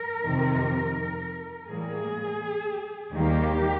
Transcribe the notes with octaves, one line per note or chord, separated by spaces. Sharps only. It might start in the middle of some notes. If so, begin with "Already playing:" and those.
Already playing: A#4
F2 C3 D#3
A2 E3 G3 A#3 G#4
D#2 D#3 G3 A#3 G4